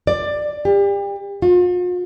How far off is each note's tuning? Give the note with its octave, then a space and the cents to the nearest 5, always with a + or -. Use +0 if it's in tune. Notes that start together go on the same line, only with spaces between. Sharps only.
D5 +15
G4 +35
F4 +45